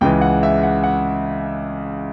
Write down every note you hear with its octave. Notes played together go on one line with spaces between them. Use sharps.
C#2 C#3 E3 G5
F#5
E5
F#5
F#5